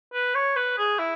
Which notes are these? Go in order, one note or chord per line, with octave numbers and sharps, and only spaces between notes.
B4
C#5
B4
G#4
E4